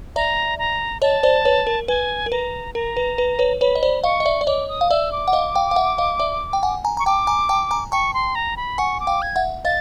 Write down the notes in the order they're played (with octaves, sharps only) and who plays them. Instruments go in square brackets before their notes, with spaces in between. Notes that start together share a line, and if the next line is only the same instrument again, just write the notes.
[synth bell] D5 E5 [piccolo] A#5
[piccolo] A#5
[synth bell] C#5 D#5 [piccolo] A5
[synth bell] C5 D5
B4 C#5
A#4
[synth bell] B4 [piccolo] G#5
[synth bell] A#4
[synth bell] B4 [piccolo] A#5
[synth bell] A#4 [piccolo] A#5
[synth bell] B4
B4
B4 C#5
[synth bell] B4 C#5 [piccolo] B5
[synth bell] D#5
C5 D5
[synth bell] D#5 F5 [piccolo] C#6
[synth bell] D#5
D5 E5
D5
[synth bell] C#5 D#5 [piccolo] D6
[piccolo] D#6
[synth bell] F5
[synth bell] D5 E5 [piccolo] E6
[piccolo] D6
[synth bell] F#5
D#5 F5
F5 G5
F5
E5 F#5
D#5 F5
D5 E5
G5
F#5 G#5
G#5 A#5
[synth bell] A#5 [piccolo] C#6
[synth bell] G5 A5 [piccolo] D6
[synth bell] G#5 A#5
G5 A5
G#5 A#5
[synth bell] G5 A5 [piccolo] C#6
[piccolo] C6
A#5
B5
[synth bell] F#5 G#5 [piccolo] C#6
[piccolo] D6
[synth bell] F5 G5
[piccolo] G#6
[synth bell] E5 F#5
[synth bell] D#5 F5 [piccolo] A6